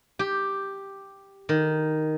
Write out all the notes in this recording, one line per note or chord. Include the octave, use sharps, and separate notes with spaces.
G4
D#3